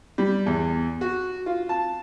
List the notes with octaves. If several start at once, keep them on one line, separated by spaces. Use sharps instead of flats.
G3
E2
F#4
F4
A5